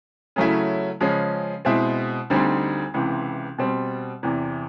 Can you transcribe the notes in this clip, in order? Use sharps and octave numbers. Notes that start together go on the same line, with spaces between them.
C#3 F#3 A3 C#4 E4
C#3 F3 G#3 C#4
B2 G#3 C4 E4
D2 D3 G3 C4 D#4
C#2 C3 E3
B2 G3 C4
E2 C3 E3